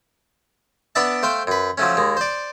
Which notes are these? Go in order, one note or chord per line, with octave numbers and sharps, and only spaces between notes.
B3 D4 D5 E5 A5
A3 C5 F5 G5
F#2 B4
F3 F#3 A3 C#4
D#2 G#3
C5 D5